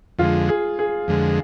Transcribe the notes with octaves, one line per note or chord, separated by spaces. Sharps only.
F2 D3 G#3 F4
G#4
G#4
F2 D3 G#3